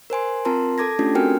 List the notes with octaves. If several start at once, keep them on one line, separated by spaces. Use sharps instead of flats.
A#4 C5 G#5 C6
C4 F4 A#4 A5 A#5 C6
A4 A5 D6 G#6 A#6
A3 C#4 D4 F4 G4 A4
C4 F#4 A#4 G5 G#5 F6